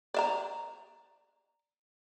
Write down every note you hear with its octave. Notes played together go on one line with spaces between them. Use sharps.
D5 E5 A#5